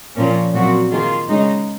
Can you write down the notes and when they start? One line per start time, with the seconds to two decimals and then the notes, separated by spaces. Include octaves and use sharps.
0.16 A#2 F3 A#3 C#4
0.54 A#2 F#3 C4 F#4
0.92 D#3 A#3 F4 G#4
1.29 C#3 G#3 D#4